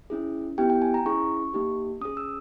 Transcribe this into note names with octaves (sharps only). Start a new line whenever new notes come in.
C#4 E4 G#4
B3 E4 G4 G5
G5
G#5
A#5
C#4 E4 G#4 C#6
A#3 D#4 G4
C#4 G#4 D#6
E6